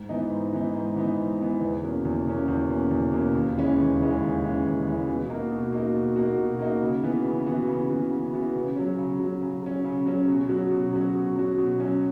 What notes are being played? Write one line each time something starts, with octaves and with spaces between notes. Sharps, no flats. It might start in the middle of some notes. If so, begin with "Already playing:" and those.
Already playing: G#2
E3 B3 D#4
G#2
E3 B3 D#4
G#2
E3 B3 D#4
G#2
E3 B3 D#4
E2
B2 A#3 C#4
E2
B2 A#3 C#4
E2
B2 A#3 C#4
E2
B2 A#3 C#4
D#2
C#3 E3 G#3 C#4
D#2
C#3 E3 G#3 C#4
D#2
C#3 E3 G#3 C#4
D#2
C#3 E3 G#3 C#4
B2
A#3 D#4 F#4
B2
A#3 D#4 F#4
B2
A#3 D#4 F#4
B2
A#3 D#4 F#4
C#3
E3 B3 F#4
C#3
E3 B3 F#4
C#3
E3 B3 F#4
C#3
E3 B3 F#4
C#3
F#3 C#4
C#3
F#3 C#4
C#3
F#3 C#4
C#3
F#3 C#4
B2
F#3 C#4 F#4
B2
F#3 C#4 F#4
B2
F#3 C#4 F#4
B2
F#3 C#4 F#4